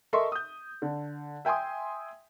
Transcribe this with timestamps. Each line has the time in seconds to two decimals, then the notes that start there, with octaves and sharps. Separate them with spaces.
0.13 A4 A#4 D#5 E5 C6 C#6
0.32 D#6 G6
0.82 D3
1.45 E5 G5 G#5 C6 D#6